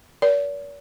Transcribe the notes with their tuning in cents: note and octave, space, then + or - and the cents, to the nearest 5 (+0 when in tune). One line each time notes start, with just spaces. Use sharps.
A#4 +25 D5 -45